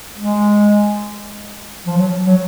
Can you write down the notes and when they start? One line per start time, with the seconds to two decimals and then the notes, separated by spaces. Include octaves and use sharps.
0.18 G#3
1.86 F3
1.97 F#3
2.26 F#3